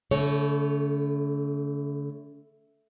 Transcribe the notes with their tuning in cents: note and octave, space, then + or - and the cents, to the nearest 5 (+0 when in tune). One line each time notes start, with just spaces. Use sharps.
D3 -45 A3 +0 C#5 +0